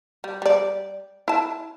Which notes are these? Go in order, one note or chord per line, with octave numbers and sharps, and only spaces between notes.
G3
G3 D5
E4 A5